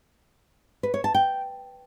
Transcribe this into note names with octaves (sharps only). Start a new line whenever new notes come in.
B4
C#5
A5
G5